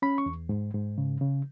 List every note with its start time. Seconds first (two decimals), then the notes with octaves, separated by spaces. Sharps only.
0.02 C#4 B5
0.18 C#6
0.26 E2
0.49 G#2
0.74 G#2
0.98 C#3
1.21 C#3